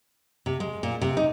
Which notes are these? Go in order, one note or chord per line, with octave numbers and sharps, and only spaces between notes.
C3
G#3
A#2
C3
D#4